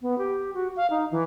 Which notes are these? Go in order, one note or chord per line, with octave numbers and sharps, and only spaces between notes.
B3
G4
F#4
F5
D#4
E3